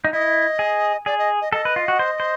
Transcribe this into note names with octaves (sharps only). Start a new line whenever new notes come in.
D#4
E4 D#5
G#4
G#4 D5
D#5
D#5
A4 D#5
B4
F4
F#4
C5
C5